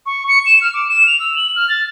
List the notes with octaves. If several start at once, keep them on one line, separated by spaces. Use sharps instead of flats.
C#6
C#7
E7
F6
D6
E7
F7
E6
F#7
F6
A6